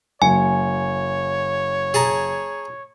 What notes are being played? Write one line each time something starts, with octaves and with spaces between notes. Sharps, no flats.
F#1 C#5 G#5
G#4 A5 A#5